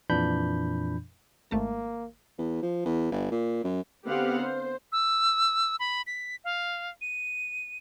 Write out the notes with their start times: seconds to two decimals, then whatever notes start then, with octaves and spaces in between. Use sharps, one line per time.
0.10 F2 A#2 E3 D4 B5 G6
1.51 G#1 A3 A#3 A5
2.38 E2
2.63 F3
2.85 E2
3.11 G1
3.31 A#2
3.64 F#2
4.06 D3 B3 C4 G4 F5 F#5
4.43 C5
4.92 E6
5.80 B5
6.07 B6
6.44 F5
7.01 D#7